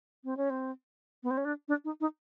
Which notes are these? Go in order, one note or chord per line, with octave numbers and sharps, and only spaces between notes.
C4
C#4
C4
B3
C4
C#4
D4
D4
D#4
D#4